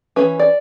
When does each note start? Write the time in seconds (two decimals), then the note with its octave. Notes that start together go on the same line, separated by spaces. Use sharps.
0.16 G#3 C#4 B4
0.21 E3
0.39 D5